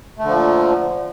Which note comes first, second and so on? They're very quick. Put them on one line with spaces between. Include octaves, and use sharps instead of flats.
A3 D3 F3 A#2